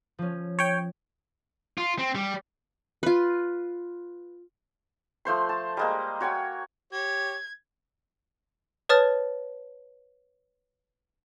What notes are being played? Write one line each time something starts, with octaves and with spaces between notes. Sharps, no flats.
F3 C#4
C#5 G5
F4
C4
G3
F4 B4
F3 A3 C5 C6
A5
G3 G#3 A#3
F#4 C#5 G5 G#5
G4 C#5 G#6
B4 C#5 A5 D#6 F6 A6